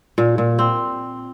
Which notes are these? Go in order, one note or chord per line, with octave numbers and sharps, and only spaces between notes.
A#2
A#2
C4